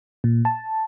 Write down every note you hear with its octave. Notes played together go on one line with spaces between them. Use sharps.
A#2
A5